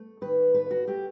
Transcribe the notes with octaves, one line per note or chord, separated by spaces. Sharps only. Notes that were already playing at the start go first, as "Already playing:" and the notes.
Already playing: A3
D#3 B4
A3 B4
F#4
A3 G4